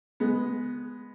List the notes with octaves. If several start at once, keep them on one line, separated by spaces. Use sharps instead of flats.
G#3 B3